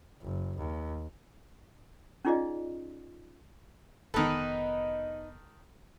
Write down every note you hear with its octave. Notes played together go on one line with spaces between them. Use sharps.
F#1
D#2
C#4 D#4 F4 G#4 D5 D#5
F1 D#3 B3 D#4 A4 B4